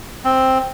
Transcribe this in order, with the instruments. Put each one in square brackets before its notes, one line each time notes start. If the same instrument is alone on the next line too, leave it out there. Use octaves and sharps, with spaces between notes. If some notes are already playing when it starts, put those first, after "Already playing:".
[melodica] C4